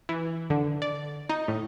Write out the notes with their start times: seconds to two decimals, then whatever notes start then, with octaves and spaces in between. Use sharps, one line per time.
0.09 E3
0.50 D3
0.82 D5
1.29 D#4
1.48 A2